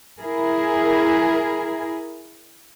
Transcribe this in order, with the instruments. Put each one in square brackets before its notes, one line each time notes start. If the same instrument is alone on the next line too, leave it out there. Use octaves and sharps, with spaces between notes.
[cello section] E4 G#4 A#4